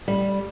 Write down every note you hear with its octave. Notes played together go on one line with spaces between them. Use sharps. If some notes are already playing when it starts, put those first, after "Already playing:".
G3